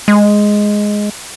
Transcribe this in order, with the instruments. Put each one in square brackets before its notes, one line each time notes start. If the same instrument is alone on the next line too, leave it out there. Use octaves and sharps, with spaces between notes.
[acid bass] G#3